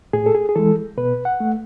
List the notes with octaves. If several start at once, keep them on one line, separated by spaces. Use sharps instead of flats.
A2 G#4
A4
G#4
G#4
E3 G#3 A4
B2 B4
F#5
A3